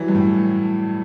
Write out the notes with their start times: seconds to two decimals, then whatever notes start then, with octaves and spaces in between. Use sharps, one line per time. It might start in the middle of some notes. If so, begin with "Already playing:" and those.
Already playing: E3 F#3 G3
0.08 G2
0.15 A2